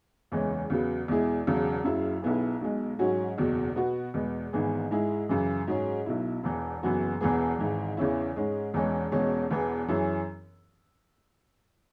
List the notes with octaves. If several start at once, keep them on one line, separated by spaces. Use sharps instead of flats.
F#1 E2 E3 G#3 C#4
E2 C#3 F#3 B3
E2 B2 G#3 E4 G#4
E1 E2 C#3 F#3
F#1 F#2 C#3 F#3 E4
B1 B2 B3 E4 G#4
B1 B2 G#3
G#2 F#3 C#4 F#4
F#1 E2 B2 F#3
B2 B3 F#4
E2 B2 G#3 B3
G#1 G#2 E3 B3 G#4
G#2 G#3 E4 G#4
F#2 C#3 E3
G#2 F#3 C#4 G#4
B1 B2 F#3 E4
E1 E2 E3
F#1 F#2 E3 B3 F#4
E1 E2 E3 B3 G#4
G#1 G#2 E3
E2 C#3 E3 C#4 E4
G#2 G#3 C#4 G#4
E1 E2 E3 G#3 C#4
E1 E2 B2 G#3 C#4
E1 E2 E3 B3 G#4
F#2 E3 C#4 E4 G#4